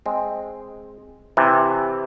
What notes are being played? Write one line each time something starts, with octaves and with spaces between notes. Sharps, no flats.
G#3 C4
C3 E3